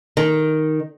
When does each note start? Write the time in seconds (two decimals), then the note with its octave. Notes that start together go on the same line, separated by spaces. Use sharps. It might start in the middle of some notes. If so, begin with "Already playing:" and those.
0.17 D#3